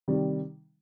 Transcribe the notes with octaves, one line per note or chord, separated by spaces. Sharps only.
C3 D#3 G3